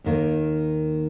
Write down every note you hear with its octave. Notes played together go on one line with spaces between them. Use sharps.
D#2 D#3 A#3